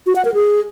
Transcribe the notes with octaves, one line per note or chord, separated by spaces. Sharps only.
F#4
F#5
A#4
G#4